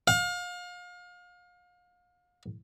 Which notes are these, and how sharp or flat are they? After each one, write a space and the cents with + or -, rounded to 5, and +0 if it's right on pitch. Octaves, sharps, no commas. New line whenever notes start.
F5 +35